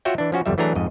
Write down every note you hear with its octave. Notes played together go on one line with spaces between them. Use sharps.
F4 F#4 C#5 E5 F#5 G5
E3 D4
F3 C#4 F#4
G1 F2 G3 E5
E3 F#3 A3 D4 G#4 A#5
F2 G#2 D#5